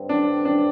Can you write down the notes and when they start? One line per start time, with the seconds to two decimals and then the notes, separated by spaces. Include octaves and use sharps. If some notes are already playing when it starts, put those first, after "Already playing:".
Already playing: G2 D3 C4
0.09 D4
0.45 D4